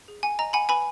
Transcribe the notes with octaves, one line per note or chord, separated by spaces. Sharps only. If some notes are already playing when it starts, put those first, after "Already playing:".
G#4
F#5 G#5
D#5 A#5
F#5 G#5 B5
B4 G#5 B5